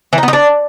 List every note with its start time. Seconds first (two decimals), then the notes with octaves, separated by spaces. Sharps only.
0.13 E3
0.18 D#4
0.23 B3
0.28 D#4
0.33 D4